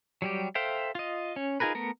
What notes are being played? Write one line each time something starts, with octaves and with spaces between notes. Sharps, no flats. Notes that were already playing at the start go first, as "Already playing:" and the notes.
F#3 G3 G4
A4 C5 E5 F5 G5
F4 D#5
C#4
D#4 F4 G#4 A#4 B4
A3 B3 A#4